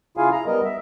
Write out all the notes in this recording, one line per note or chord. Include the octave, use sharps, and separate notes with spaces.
C#3 E4 F4 G#4 F5 G#5
A#5
G3 B3 A#4 D#5
E5